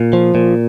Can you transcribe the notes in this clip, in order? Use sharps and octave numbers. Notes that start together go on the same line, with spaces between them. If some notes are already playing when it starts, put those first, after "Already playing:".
Already playing: A#2
F3
A#2